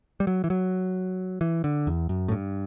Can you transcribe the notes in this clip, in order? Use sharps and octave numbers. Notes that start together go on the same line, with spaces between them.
G3
F#3
E3
F#3
E3
D3
E2
F#2
A2
G2